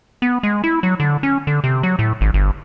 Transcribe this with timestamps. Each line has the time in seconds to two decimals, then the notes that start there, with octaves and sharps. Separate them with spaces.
0.22 B3
0.43 G#3
0.64 E4
0.83 F#3
1.00 D3
1.23 C#4
1.47 D3
1.64 C3
1.83 F#3
1.99 A2
2.21 G#1
2.34 G1